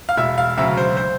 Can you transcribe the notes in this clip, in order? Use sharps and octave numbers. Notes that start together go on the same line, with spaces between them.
F5
E1 E5
F5
D2 C#3 F#3 E5
C5
C5